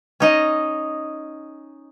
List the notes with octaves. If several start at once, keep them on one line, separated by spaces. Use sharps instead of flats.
C#4 D#4 D#5